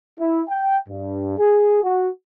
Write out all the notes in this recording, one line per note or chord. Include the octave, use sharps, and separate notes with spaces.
E4
G5
G2
G#4
F#4